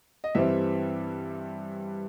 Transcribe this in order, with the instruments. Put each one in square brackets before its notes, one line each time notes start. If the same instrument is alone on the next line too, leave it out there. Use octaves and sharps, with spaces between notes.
[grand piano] D#5
G2 E3 G3 C4 E5